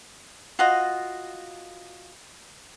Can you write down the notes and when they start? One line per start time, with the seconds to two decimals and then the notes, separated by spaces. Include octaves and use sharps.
0.59 F4 F#4 D#5